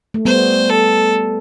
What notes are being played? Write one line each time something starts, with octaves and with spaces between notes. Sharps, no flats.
A3
G3 B3 C5
A4